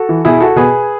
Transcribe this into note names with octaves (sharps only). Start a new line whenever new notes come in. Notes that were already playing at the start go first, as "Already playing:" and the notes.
Already playing: F#4 A4
E3
B2 E4 G#4
F#4 A4
B2 G#4 B4